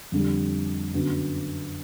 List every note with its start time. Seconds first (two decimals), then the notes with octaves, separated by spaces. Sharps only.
0.12 F2 D3 G3
0.94 F#2 D3 F#3 B3